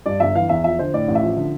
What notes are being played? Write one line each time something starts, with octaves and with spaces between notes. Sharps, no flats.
G2 D5
G1 E5
E3 F5
E2 E5
F3 E5
D3 C5
A2 D5
A1
E5
F3
D3